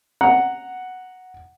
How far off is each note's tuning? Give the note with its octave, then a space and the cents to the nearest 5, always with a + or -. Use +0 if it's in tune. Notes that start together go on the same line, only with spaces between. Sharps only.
F#5 +0 A#5 +0